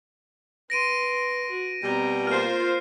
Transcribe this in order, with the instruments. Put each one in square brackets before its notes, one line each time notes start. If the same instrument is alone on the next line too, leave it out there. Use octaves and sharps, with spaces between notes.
[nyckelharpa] B4 C6 [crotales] A#6 D7 D#7
[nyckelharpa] F#4
[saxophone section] B2 G3 [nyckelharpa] C4 A#5
[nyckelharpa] A#3 [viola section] F4 C5 [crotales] F6 C7